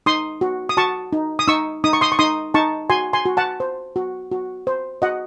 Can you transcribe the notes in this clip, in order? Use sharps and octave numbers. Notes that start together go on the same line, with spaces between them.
D#4 C6 D#6
F#4
D#6
F#4 A5 C#6
D#4
D#6
D#4 C#6 E6
D#4 D#6
C#6
C6 D#6
C#6
D#4 C6 D#6
D#4 A5 C#6
F#4 G#5 C6
G#5 C6
F#4
F#5 A5
C5
F#4
F#4
C5
F#4 D#5 F#5